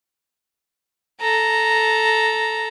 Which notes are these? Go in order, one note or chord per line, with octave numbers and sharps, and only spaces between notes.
A4 A#5